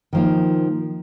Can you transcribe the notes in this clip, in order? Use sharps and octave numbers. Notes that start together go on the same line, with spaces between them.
D#3 F3 A#3